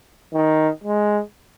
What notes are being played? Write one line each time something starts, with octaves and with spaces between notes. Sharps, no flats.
D#3
G#3